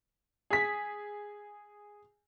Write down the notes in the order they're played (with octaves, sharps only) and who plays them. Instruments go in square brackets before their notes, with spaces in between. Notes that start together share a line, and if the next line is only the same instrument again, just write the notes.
[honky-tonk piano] G#4 B6